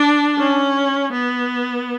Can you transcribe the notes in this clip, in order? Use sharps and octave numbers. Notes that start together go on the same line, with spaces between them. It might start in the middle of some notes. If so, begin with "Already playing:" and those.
Already playing: D4
C#4
B3